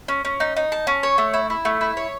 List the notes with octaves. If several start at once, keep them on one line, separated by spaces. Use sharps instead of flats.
C#4
C#4
D#4
D#4
A5
C#4
C#5
A3
E4
E4
A3
E4
C#5